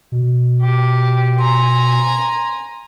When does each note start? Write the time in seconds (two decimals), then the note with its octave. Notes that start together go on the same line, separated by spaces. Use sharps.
0.12 B2
0.61 G4
1.39 G#5 A#5 C6